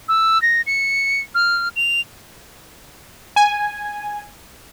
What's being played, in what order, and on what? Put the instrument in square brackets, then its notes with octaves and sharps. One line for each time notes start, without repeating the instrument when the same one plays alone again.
[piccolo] E6
A#6
C#7
F6
F7
[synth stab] G#5